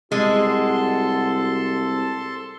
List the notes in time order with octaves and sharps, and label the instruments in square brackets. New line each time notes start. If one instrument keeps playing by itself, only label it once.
[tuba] C2 [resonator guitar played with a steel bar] G#3 [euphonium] F#4 [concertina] A4 A5 C6